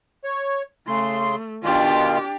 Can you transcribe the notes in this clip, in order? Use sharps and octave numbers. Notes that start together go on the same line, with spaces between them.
C#5
C#3 A3 C6
B2 D#3 D4 F4 G4